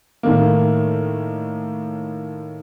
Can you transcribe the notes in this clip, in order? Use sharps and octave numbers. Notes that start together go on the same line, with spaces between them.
A2 D#3 A#3